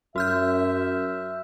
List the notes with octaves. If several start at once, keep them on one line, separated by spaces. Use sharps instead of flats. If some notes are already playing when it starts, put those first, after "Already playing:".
F#2 F#4 E5 F6 G6